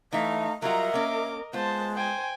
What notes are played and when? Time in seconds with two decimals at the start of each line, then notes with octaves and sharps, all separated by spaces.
0.13 E3 A3 D#4 E5 F5
0.62 F#3 G3 F4 A#4 D#5 E5 F#5 A#5
0.94 A#3 C#4 D6
1.53 G#3 B3 F4 C5 A5
1.95 C5 G5 G#5